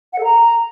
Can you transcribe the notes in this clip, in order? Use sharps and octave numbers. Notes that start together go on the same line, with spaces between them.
F#5
A4
A#5